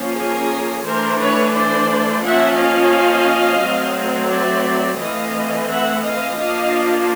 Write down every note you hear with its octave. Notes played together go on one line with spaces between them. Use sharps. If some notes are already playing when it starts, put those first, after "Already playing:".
Already playing: F3 A#3 C#4
G#4 A#4
E3 A3 D4 A#4 C5
B4 C#5
C5 D5
F3 A#3 C#4 E5 F#5
D#5 F5
F#3 A3 C4
D5 E5
E3 A3 C4 D#5 F5
E5 F#5
D#5 F5
F3 A#3 D4 D#5 F5